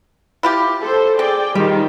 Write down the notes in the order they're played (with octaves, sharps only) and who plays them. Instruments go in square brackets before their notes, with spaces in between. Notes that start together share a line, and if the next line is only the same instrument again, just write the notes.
[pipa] E4 F4 G4
[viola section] A4 C5
[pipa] C4 [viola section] G#4 D5 G5
[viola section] D#3 F4 [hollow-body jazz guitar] G3